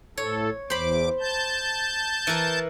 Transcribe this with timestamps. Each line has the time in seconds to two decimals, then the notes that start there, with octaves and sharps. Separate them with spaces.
0.18 A2 A4 C#5
0.70 E2 C5 B5 D6
1.20 A5 G6
2.27 E3 A#4